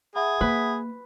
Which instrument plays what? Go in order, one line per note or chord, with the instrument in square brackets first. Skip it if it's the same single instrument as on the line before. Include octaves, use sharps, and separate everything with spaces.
[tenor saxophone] G#4 [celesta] E5 F#5 B5
[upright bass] A#3 [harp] B4